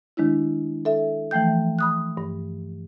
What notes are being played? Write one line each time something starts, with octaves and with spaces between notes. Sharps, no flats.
D#3 G#3 D4 E4
A4 E5
E3 F3 A3 G5 G6
B5 D#6 F#6
G2